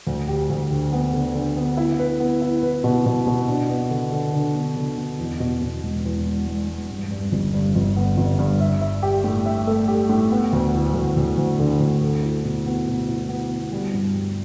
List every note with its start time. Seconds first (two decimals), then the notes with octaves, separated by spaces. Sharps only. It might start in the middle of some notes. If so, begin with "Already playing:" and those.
0.07 D2
0.28 G4
0.50 D2
0.71 D3
0.93 B3
1.13 D3
1.35 D3
1.57 B3
1.77 E4
1.99 B4
2.20 B3
2.41 E4
2.63 B4
2.84 B2
3.06 B2
3.27 B2
3.48 D4
3.70 B3
3.90 D3
4.12 D3
4.33 D3
4.55 B3
4.76 D3
4.98 B3
5.19 E2
5.40 B2
5.62 B2
5.83 E1
6.05 E2
6.26 E1
6.47 E1
6.68 E1
6.89 G2
7.11 G2
7.32 G1
7.54 G2
7.75 G1
7.96 B3
8.18 G1
8.39 G2
8.60 E5
8.81 E5
9.03 G4
9.24 A2
9.46 E5
9.67 A3
9.88 G4
10.09 A2
10.31 B3
10.53 D2
10.74 E4
10.94 D2
11.16 D2
11.37 D2
11.60 D3
11.80 D2
12.02 A4
12.22 E4
12.44 B2
12.66 B3
12.88 B2
13.08 E4
13.29 B3
13.51 B3
13.72 G3
13.94 G2
14.15 G3